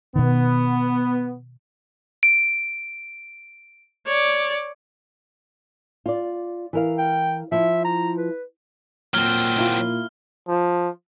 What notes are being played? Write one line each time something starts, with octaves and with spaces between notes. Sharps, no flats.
B2 D#3 B3
D7
C#5 D5
F4 D5
E3 A#4 F5
G5
F3 E4 E5
A#5
B4
A#2 F#3 C4 F6 G7
A#3 E4 F4
F3